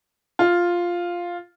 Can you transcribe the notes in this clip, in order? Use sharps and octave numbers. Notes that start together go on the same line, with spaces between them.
F4